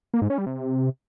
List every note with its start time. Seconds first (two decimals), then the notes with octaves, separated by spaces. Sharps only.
0.14 A#3
0.22 G#2
0.30 C#4
0.38 G3
0.46 C3